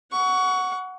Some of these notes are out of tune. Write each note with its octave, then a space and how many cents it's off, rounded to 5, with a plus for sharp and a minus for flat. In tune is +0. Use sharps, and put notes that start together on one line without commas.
F#5 +0 C#6 +25